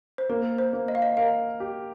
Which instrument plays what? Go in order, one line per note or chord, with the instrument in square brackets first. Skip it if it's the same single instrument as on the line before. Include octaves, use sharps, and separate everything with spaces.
[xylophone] C5
[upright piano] A#3 [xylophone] A#4
[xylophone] C5
[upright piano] A#3
[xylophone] D#5
F5
D#5
[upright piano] A#4 [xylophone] F5
[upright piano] G4